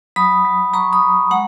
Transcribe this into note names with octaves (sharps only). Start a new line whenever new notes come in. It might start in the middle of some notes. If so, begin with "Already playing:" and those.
F#3 B5 D#6
F#3
F#3 A#5 C#6
B5 D#6
F#3
G#3 F#5 A#5